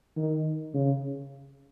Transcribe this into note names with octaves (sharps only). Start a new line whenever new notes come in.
D#3
C#3